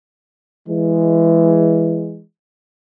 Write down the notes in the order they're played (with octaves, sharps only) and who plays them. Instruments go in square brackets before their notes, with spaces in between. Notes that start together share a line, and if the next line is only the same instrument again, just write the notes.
[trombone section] E3 G#3